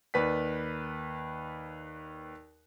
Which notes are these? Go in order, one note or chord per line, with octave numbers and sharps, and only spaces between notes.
D#2 B4 D5 B6